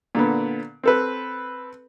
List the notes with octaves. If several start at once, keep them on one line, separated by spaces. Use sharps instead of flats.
A#2 D3 B3
C4 A4 B4